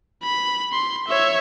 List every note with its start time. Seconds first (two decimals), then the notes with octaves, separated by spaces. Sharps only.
0.23 B5
0.73 C6
1.08 C#5 E5